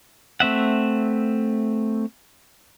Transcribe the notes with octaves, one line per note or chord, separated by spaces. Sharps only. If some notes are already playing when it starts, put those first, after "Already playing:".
A3 C4 E5 F#5